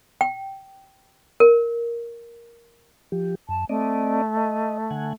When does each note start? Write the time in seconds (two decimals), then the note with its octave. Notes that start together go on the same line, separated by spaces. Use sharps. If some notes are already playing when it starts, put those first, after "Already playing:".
0.21 G5
1.40 A#4
3.12 F3 G4
3.49 F#2 A5
3.69 A3 C4 D5 D#5
4.37 D#5
4.91 D3 F#5 G#5